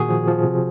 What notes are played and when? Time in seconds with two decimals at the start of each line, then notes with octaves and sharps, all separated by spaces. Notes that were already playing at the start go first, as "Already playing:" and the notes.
Already playing: A#2 D#3 F#4 G#4
0.09 F3
0.27 F3
0.44 C3